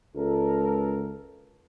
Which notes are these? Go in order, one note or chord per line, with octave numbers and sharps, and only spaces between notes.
C#2 A4 A#4